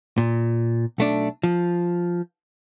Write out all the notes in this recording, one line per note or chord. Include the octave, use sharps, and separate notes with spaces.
A#2
B1 A3 D4
F3